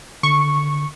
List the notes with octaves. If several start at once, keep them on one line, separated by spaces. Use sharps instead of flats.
D3 C#6